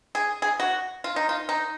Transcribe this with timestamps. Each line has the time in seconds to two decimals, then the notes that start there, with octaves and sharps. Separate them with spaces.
0.15 G#4
0.42 G#4
0.60 F#4
1.04 F4
1.16 D#4
1.29 F4
1.49 D#4